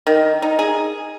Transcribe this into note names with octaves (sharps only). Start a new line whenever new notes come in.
D#3
D#4
G#4